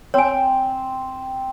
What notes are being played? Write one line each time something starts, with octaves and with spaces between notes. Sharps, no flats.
C4 C#5 G#5